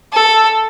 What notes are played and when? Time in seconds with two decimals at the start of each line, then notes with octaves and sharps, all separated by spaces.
0.13 A4